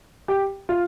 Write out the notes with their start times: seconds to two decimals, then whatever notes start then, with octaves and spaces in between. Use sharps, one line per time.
0.28 G4
0.69 F4